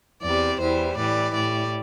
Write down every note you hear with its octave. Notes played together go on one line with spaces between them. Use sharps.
E2 C3 G3 D5
E2 E3 G3 C5
A2 E3 G3 D5
A2 G3 D5